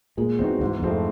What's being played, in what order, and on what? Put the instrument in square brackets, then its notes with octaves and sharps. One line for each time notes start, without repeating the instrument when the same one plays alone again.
[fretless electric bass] A#2 [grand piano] G#3
[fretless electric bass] E2 [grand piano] C4 D#4 F#4
[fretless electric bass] E2 [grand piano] G#2
[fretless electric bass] F2 [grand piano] F3 A3 C4 E4